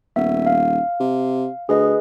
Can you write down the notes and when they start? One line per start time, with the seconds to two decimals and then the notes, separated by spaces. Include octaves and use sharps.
0.16 D#1 B3 E5
0.46 F5
1.00 C3
1.69 D2 G#4 B4 D#5